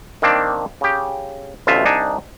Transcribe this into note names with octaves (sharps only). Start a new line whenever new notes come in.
D#3 A#3 C4 D4
C#3 G4
A1 D2 B2 F4 E5
C2 D4 D#4 G#5